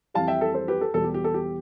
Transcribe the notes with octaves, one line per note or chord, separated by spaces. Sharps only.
F2 E3 G3 F5 A5
E5 G5
A4
A4 C5
G4 B4
A4
E2 B2 G3 A4
G4
G4
A4
G4